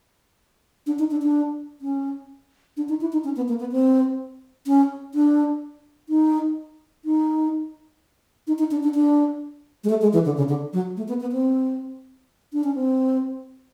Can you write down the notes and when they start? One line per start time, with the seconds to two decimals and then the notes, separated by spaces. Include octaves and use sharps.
0.87 D4
0.99 D#4
1.11 D4
1.22 D4
1.81 C#4
2.77 D4
2.89 D#4
3.01 E4
3.12 D#4
3.24 C#4
3.36 B3
3.48 A#3
3.60 B3
3.72 C4
4.67 C#4
5.14 D4
6.09 D#4
7.05 D#4
8.47 D#4
8.59 D#4
8.71 D4
8.83 D4
8.95 D4
9.84 G#3
9.89 A3
10.01 G#3
10.13 E3
10.25 D3
10.37 C#3
10.49 D3
10.73 F#3
10.97 A3
11.08 B3
11.20 B3
11.32 C4
12.53 D4
12.64 C#4
12.75 C4